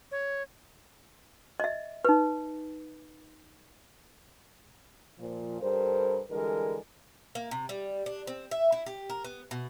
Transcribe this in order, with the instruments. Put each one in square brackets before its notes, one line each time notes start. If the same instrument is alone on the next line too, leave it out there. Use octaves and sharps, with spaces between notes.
[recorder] C#5
[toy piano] D#5 E5
D#4 B4
[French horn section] A#2 F3
G2 G3 A4 A#4 C5
D3 E3 G3 G#3 A4 A#4
[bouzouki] A#3
C3
G3
D4
C4
E5
E4
G4
A#4
B3
B2